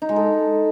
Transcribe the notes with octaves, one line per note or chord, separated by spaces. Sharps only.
D#4
G#3
A4